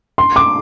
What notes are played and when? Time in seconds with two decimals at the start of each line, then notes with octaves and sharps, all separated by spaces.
0.18 C6
0.36 D6